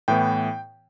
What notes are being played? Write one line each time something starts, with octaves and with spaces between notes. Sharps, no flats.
A2 E3 B3 G5